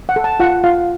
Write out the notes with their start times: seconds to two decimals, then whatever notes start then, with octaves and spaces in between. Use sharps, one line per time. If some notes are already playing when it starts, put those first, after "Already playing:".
0.09 F#5
0.16 A4
0.24 A5
0.40 F4 F#5
0.64 F4 F5